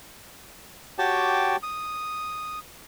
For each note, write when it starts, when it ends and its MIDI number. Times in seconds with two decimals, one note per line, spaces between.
0.99 1.56 66
0.99 1.56 67
0.99 1.56 73
0.99 1.56 79
0.99 1.56 81
0.99 1.56 86
1.63 2.59 87